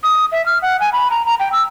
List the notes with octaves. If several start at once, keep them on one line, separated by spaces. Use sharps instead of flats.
D#6
E5
F6
F#5
G#5
B5
A#5
A#5
G5
E6